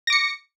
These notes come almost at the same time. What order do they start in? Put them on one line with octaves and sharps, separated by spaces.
A#6 D6 C#7